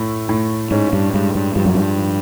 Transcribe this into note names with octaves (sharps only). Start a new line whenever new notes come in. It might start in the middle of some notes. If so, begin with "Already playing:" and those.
Already playing: A2 A3
A2
G#2 C#4
G2
G2 G#3
G2
G2 F3
F#2
G2
F3